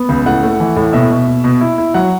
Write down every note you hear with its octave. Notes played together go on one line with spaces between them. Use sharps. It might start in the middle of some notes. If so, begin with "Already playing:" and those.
Already playing: B3
C#2
A2 F#5
A3
E3
A2
B2 E5
B2
B2
B2
E4
E4
F#3 F#5